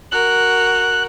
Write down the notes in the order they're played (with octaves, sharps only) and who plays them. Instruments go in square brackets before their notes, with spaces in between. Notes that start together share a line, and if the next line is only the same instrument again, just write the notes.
[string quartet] F#4 A#4 [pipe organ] F#6